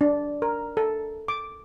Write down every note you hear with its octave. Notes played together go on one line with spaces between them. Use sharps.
D4
A#4
A4
D6